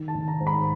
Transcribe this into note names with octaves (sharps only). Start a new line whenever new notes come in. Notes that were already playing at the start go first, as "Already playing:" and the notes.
Already playing: D#3
A5
D#3
A#5
G#2
B5